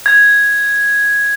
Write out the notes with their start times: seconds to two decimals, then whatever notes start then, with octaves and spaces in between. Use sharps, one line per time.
0.06 G#6